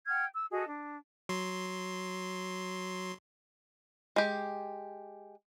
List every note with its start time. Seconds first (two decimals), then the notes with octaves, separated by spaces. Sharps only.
0.08 F#5 G5 F6 G#6
0.34 E6
0.52 F#4 G#4 A4 D#5
0.68 D4
1.29 F#3 C6
4.16 G#3 G4